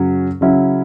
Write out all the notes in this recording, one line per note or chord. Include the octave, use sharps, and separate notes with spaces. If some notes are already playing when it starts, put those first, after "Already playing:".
Already playing: F#2 C#3 F#3 C#4
C#3 F#3 C#4 E4